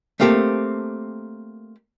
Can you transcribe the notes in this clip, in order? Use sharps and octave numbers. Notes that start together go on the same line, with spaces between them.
A3 A#3 C4 G4 A4